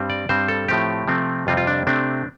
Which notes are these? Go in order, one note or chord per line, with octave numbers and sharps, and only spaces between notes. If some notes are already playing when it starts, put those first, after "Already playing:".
Already playing: G2 G3 C4
D5
G2 G3 C4 C5
A4
A2 F3 A3 C4 G4
C3 F3 A3 C4
F2 C3 G3 C4 F4
F4
D4
C3 A3 C4 D4